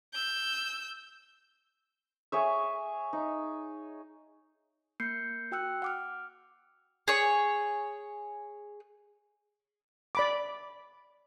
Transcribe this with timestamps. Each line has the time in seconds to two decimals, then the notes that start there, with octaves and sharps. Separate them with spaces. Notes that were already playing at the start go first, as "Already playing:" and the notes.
0.13 E6 G6
2.32 G#4 C#5 E5
3.13 D#4
5.00 A#3 G6 C7 C#7
5.52 F#4 G5 E6 F#6 C#7
5.82 F#5 D6 F6
7.08 G#4 C#5
10.15 D5 B5 D6